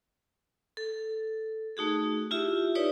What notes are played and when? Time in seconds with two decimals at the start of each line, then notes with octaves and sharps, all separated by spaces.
0.77 A4
1.77 A3 D#4 F#4 G#4
2.31 E4 F4 G4 E5
2.75 D#4 G4 B4 C#5 D5